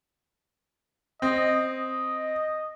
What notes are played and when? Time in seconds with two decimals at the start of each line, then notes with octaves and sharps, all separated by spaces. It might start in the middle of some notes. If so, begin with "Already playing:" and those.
1.22 C4 D#5
1.66 D#5